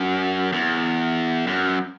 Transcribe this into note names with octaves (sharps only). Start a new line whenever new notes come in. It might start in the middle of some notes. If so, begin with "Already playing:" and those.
Already playing: F#2
E2
F#2